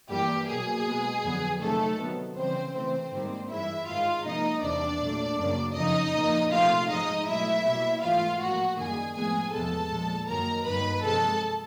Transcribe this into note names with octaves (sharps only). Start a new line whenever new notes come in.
G2 E3 G3 A#3 G4
B2 F#3 A#3 G#4
B2 G#3 B3
F2 D3 F#3 B3
C3 D#3 F#3 A3 A4
C3 D#3 F#3 B3
C#3 E3 G3 C4 C5
C3 E3 A3 C4 C5
G#2 D#3 G3 A#3
G2 E3 G#3 E4 E5
G#2 D#3 G#3 F4 F5
C3 F3 A#3 D#4 D#5
E2 C3 E3 G3 D4 D5
A#2 F#3 A3
F#2 C#3 F#3 A#3
F2 C#3 F3 D#4 D#5
A#2 F3 A#3
C3 F3 A3 F4 F5
G#2 F3 G#3 D#4 D#5
B2 F#3 A3 E4 E5
B2 G3 A#3
G#2 E3 A3 F4 F5
A2 F3 A#3 F#4 F#5
F#2 D#3 G3 A#3 G#4 G#5
A2 F3 G#3 B3 G#4 G#5
E2 C3 F3 G#3 B3 A4 A5
A#2 F3 G#3
F#2 D#3 F#3 A#3 A#4 A#5
G2 D#3 F#3 A#3 B4 B5
C3 F3 G#3 A4 A5